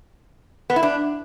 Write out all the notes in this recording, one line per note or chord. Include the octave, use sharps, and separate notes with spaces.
B3
E4
D4